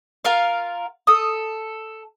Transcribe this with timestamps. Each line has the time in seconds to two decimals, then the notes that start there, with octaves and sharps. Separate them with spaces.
0.25 F4 A#4 F5
1.07 A4 D#6